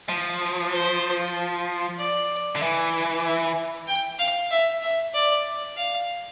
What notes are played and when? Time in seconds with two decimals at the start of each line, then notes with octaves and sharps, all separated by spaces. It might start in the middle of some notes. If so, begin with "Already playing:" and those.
0.09 F3
0.73 C5
1.99 D5
2.56 D3
2.62 E3
3.25 E5
3.87 G5
4.19 F5
4.51 E5
4.83 E5
5.14 D5
5.77 F5